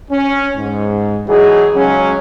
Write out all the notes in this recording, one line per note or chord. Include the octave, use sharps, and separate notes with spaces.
C#4
G#2
B2 E3 F#3 D#4 G#4
C#3 F#3 G#3 C#4